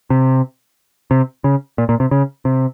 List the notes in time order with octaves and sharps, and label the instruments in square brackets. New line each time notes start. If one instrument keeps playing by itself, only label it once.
[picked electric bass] C3
C3
C#3
A#2
A#2
C3
C#3
C3